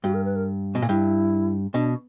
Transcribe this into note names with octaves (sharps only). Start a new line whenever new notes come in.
G2 F#4
A#4
B4
A#4
B2
A#2
G2 E4
B2 D4